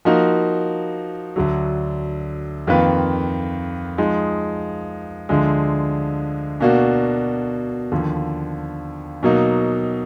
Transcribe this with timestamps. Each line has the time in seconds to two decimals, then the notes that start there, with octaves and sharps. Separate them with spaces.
0.05 F3 A#3 D#4 F#4 A#4
1.36 D2 D3 F#3
2.67 F2 D#3 A#3 F4 B4
3.98 F3 G#3 D#4
5.29 D2 D3 F3 G#3
6.61 B2 A#3 D4 F#4
7.92 D#2 D3 F3
9.23 B2 F#3 A#3 D#4